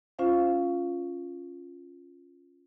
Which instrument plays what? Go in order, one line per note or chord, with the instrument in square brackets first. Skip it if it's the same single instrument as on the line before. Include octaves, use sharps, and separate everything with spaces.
[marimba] C#4 F4 C5 F5